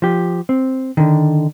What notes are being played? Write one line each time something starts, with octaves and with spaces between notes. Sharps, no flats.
F3 G4
C4
D3 D#3